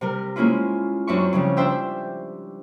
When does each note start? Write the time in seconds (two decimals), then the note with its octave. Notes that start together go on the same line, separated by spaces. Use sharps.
0.01 C3 G3 A#4
0.36 G#3 A#3 C#4 E4 F4
1.07 F#2 C4 D4 E5 C#6
1.33 C#3 F3 G3
1.57 D4 C5 E5 G5 E6